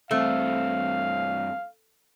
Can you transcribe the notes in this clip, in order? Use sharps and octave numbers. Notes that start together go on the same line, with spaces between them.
G2 A3 C4 F5